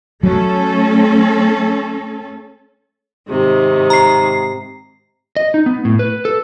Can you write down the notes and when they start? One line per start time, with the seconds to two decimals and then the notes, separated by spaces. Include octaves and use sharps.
0.23 F#3 A3 C#4 A4
3.28 G#2 C3 D#3
3.90 A#5 C7
5.37 D#5
5.54 D#4
5.66 B3
5.85 A2
5.99 B4
6.25 A4